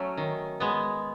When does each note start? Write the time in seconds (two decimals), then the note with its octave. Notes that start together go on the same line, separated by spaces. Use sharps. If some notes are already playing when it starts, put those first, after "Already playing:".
Already playing: F#3 A3 C#4
0.17 D#3
0.60 G#3 B3